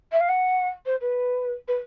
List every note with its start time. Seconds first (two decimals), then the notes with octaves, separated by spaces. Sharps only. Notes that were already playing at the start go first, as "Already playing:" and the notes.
0.12 E5
0.20 F5
0.29 F#5
0.86 C5
1.01 B4
1.68 B4